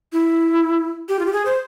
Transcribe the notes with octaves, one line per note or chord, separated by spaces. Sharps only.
E4
G4
F4
G4
G#4
C5